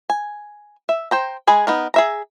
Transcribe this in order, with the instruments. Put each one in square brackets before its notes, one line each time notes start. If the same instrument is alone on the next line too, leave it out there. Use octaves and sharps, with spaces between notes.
[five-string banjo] G#5
E5
C5 G5 A#5
G#3 G#4 G#5 B5
B3 D#4 A#4
G#4 E5 A#5